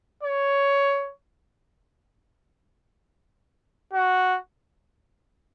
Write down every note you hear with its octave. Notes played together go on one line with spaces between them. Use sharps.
C#5
F#4